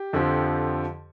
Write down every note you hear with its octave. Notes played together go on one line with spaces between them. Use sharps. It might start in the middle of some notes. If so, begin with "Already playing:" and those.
Already playing: G4
F2 D3 F3